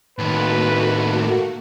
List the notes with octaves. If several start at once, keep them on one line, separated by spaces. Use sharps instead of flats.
A2 D#3 A3 A#3 F#4 B4